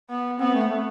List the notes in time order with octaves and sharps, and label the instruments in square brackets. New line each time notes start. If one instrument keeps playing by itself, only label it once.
[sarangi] B3
[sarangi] B3 [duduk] C4
[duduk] A3
A3